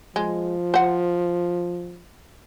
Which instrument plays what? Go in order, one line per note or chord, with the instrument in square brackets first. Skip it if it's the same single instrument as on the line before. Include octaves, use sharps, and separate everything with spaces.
[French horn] F3 [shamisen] G#3
[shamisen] C5 F#5